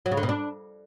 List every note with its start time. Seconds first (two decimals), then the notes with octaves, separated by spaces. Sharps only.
0.06 F#3
0.11 C#3
0.17 D3
0.23 B2
0.29 D4